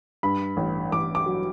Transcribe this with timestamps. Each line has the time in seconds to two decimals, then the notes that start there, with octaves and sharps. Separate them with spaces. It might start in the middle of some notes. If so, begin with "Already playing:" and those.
0.23 G2 B5
0.57 A1
0.92 A1 D6
1.15 D6
1.26 F#3